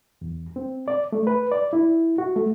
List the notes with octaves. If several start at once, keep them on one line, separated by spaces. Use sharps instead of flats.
E2
C4
D5
A3
B4
D5
E4
F#4
A3